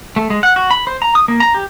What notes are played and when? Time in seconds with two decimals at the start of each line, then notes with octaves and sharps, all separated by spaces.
0.16 A3
0.30 G#3
0.43 F#5
0.56 F#4
0.71 B5
0.87 C5
1.02 A#5
1.15 D#6
1.28 A#3
1.40 A#5
1.54 G4